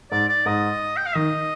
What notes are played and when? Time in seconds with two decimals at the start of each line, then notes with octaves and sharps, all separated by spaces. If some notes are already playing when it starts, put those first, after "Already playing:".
0.11 G#2 D5
0.29 D5
0.46 G#2 D#5
0.97 G5
1.06 F5
1.15 D#3 D#5